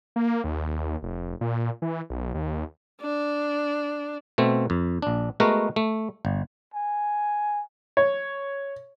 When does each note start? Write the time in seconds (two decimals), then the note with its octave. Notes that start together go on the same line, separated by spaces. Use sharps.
0.16 A#3
0.44 D#2
1.03 F1
1.41 A#2
1.82 E3
2.10 B1
2.34 D#2
3.01 D4
4.38 B2 A3 C4
4.70 F2
5.02 A#1 D4
5.40 G#3 A3 B3 F#4 A#4
5.76 A3
6.25 G1
6.74 G#5
7.97 C#5